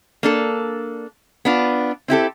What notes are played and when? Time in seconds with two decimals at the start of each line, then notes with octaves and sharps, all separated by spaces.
0.23 A#3 D4 A4
1.45 B3 D4 F4
2.08 C4 E4 G4 A4